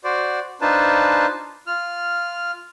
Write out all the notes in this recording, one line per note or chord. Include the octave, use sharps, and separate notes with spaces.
F#4 C5 D5
D4 D#4 F4 B4 C5 A5
F4 F6